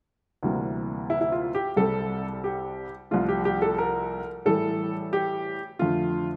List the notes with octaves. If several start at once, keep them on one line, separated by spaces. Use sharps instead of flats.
D2 C3 E3 G3 A#3
E4
E4
F4
G4
C2 C3 G3 A4
G4
C2 C3 F3 A3 F4
G4
G4
A4
A#4
A2 E3 G3 A4
G4
F2 D3 A3 F4